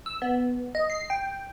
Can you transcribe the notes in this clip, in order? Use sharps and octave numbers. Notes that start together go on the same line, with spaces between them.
E6
B3
D#5
C7
G5